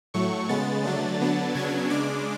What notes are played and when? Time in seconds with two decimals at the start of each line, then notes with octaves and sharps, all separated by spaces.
0.14 A2 F#3 A3 C#6
0.49 C#3 G#3 B3 A6
0.84 D3 F#3 A3 D4
1.20 D3 F#3 B3 D4
1.55 C#3 F#3 B3 D4 G#6
1.90 C#3 G#3 D4 D6